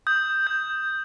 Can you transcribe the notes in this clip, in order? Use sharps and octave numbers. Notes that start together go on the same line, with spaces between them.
D#6 G6
G6